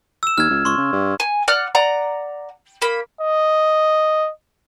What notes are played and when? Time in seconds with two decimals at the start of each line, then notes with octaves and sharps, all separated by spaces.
0.23 E6 E7
0.38 D#2 F6 G#6
0.51 C#2
0.65 C#2 C6 C#6
0.77 C#3
0.93 G2
1.20 G#5
1.48 D5 F#5 F6 F#6
1.75 D5 F#5 A#5
2.82 A#3 B5
3.21 D#5